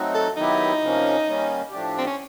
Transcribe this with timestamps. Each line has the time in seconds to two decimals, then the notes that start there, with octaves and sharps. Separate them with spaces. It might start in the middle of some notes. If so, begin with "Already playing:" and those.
Already playing: F#3 A3 C4 D#4 F#4
0.14 A4
0.36 D#3 F#3 B3 D#4 E4 G4
0.82 C3 F3 A#3 C#4
1.26 D#3 G3 A#3 C#4
1.71 A2 F3 A3 D4 G4
1.98 C4
2.07 C#4